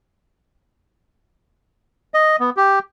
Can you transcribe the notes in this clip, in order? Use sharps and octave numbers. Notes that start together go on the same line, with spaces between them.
D#5
B3
G4